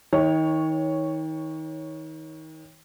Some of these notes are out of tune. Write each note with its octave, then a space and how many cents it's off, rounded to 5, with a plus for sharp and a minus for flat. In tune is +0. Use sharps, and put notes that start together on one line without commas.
D#3 +30 C#5 +0